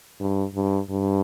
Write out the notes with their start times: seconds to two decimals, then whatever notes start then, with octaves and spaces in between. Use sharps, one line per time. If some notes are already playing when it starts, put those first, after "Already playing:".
0.20 G2
0.55 G2
0.91 G2